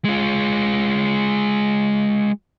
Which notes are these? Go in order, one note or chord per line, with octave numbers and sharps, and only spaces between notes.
G#3 F4